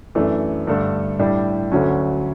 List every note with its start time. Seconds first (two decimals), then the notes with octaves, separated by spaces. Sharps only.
0.15 F#2 E3 A3 D4
0.67 G2 D3 A3 D4 A4
1.19 A2 G3 D4 G4
1.72 D2 D3 F#3 C#4